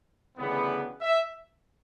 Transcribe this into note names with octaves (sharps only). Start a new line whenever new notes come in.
D2 C#3 E3 G3 B3
E5